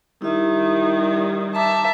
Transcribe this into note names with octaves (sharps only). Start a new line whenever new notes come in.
D#3 G3 E4 E5
E5 A5 A#5 D6